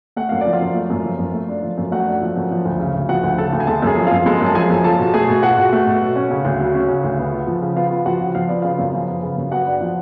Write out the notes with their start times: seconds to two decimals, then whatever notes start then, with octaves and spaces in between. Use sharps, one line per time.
0.16 A3 F#5
0.29 F#2 F5
0.41 D5
0.46 F3
0.53 F4 F5
0.61 F#2
0.75 A3
0.90 F#2
1.05 F3
1.19 F#2
1.34 A3
1.49 D4
1.63 F3
1.78 F#2
1.92 A3 F#4 F#5
2.07 D4
2.22 F3
2.36 F#2
2.51 F3
2.65 D2
2.80 C#3
2.95 D2
3.09 F3 F#4 F#5
3.23 D2
3.38 C#3 A4 A5
3.53 D2
3.60 G#5
3.67 G#3 A4 A5
3.82 F#2 G#4 G#5
3.97 F3
4.07 F#2 F4 F5
4.26 G#3 A4 A5
4.41 F#2
4.46 A5
4.55 F3 G#4 G#5
4.70 F#2
4.84 F4 A4 A5
4.99 B2
5.14 A3 G#4 G#5
5.28 B2
5.43 F4 F#4 F#5
5.57 B2
5.72 A3
5.87 B2
6.01 F#3
6.16 C#4
6.31 C#3
6.45 D2
6.60 F#3
6.74 C#4
6.88 C#3
7.04 D2
7.19 B3
7.32 F4
7.47 F3
7.62 C#3
7.77 B3 F4 F5
7.91 F4
8.06 F3 F#4 F#5
8.20 C#3
8.35 F3 F5
8.48 B3 D5
8.62 C#3 F4 F5
8.79 F#2
8.93 F3
9.08 B3
9.23 C#3
9.37 F#2
9.51 B3 F#4 F#5
9.67 D4
9.81 F3